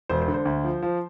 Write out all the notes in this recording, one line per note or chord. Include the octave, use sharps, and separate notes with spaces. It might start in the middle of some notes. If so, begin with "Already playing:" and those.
E1 C5
C5
D3
C5
D2
F3
F3